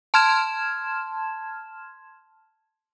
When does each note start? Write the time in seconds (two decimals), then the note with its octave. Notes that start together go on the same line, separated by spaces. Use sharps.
0.14 A5 C6 F6 G#6 E7